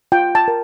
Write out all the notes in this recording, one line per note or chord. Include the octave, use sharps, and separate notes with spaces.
F4 G5
A5
A#4